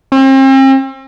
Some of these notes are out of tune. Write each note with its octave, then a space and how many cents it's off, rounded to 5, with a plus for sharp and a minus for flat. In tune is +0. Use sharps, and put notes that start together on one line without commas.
C4 +40